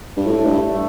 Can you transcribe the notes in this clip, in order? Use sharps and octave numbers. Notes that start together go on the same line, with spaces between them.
G2
A2 A3
G2